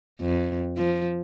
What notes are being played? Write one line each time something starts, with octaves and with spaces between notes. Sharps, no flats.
F2
F3